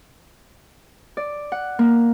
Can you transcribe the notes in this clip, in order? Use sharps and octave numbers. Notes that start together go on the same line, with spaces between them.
D5
F#5
A#3